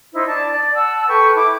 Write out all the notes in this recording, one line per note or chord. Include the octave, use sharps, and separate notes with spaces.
D#4 E4 C5
D4 A5
D5
F#5 A5 E6
A4 B4 G5 C#6
E4 D6